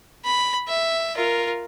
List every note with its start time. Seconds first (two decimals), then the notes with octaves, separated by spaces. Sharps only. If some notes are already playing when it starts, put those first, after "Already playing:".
0.25 B5
0.69 E5
1.15 F4 A#4